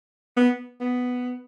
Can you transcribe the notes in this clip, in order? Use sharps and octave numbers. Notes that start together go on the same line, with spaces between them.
B3
B3